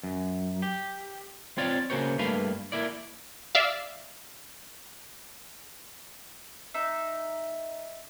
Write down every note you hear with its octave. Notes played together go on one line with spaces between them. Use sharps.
F#2
G4
C4 F4 C#5 D5 F5
C#3 A#3 F#4 C5 C#5
G2 A3 A#3 B4 F5
A#3 E4 D5
D5 E5 F5
D#4 E5